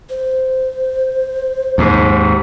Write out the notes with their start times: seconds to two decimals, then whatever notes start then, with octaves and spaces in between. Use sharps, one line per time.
0.10 C5
1.78 D#2 G#2